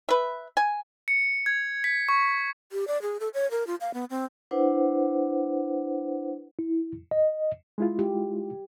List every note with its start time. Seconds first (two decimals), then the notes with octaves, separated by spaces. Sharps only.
0.09 B4 E5
0.57 G#5
1.08 C#7
1.46 G#6
1.84 B6
2.09 C#6
2.72 G4
2.87 D5
3.02 G#4
3.20 A4
3.34 C#5
3.51 A#4
3.67 F4
3.81 F5
3.94 B3
4.10 C4
4.51 D4 E4 B4 C5 F#5
6.59 E4
7.11 D#5
7.78 G#3 E4 F4
7.99 G4